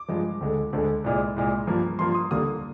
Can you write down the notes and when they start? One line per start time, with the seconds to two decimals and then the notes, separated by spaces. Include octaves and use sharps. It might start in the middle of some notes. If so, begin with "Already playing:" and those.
Already playing: D6
0.08 G2 F3 G#3
0.41 D2 D3 G#3
0.73 D2 D3 G#3
1.04 C2 A#2 G#3
1.36 C2 A#2 G#3
1.67 G2 F3 A#3
1.99 G2 F3 A#3 C6
2.15 D#6
2.31 D#2 D3 G3 A#3 D#6